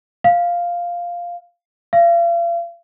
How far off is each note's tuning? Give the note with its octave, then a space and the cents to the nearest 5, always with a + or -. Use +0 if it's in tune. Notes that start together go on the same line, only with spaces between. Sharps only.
F5 +0
F5 -40